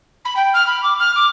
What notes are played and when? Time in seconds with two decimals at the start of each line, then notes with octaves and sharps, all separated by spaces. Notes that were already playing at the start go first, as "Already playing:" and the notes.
0.25 B5
0.36 G5
0.53 F6
0.66 B5
0.83 D6
0.99 F6
1.15 D6